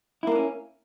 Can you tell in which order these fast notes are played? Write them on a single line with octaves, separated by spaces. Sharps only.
E4 A#3 D4 C#4